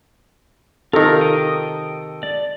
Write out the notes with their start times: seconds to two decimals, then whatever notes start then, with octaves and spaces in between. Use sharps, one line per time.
0.93 C3 D#3 F4 A4 A#4
1.21 G5 D#6
2.23 D5